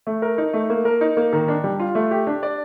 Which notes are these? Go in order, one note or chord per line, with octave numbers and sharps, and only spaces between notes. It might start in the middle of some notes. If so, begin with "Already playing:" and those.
A3
A#4
D#4
A3
A#3
A#4
D#4
A#3
D#3
D4
G3
F4
A3
G4
D4
D5